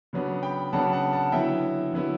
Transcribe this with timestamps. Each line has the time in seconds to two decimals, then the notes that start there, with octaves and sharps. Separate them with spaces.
0.13 C#3 F#3 B3 D4
0.43 G5 B5
0.73 C#3 F#3 B3 D4 F#5 A5
0.93 F#5 A5
1.13 F#5 A5
1.32 D3 F#3 B3 E4 E5 G5
1.92 D3 F#3 B3 E4